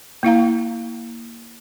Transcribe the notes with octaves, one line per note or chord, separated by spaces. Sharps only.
A#3 E4 F5 A#5